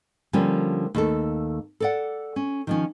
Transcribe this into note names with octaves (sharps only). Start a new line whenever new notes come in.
D3 F3 G3 A#3 C#4
D#2 A3 A4
A4 D5 F#5
C#4
D#3 F3 C#4